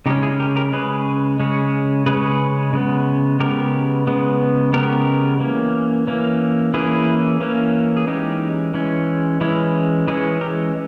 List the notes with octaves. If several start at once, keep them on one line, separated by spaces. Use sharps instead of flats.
C#3 G#3 C#4 D#4 G4
E4 G#4
G4 A#4
G4 A#4
C#3 G#3 C#4 G#4 B4
C#3 G#3 C#4
C#3 G#3 C#4 G#4 B4
C#3 G#3 B3
C#3 G#3 B3 G4 A#4
C#3 G#3 B3
C#3 G#3 B3 G4 A#4
E3 A#3 C#4
E3 A#3 C#4
E3 A#3 C#4 E4 G#4
E3 A#3 C#4
G#4
E3 G#3 C#4 D#4 G4
E3 G#3 C#4
E3 G#3 C#4 E4
E3 G#3 C#4 E4 G#4
G4 A#4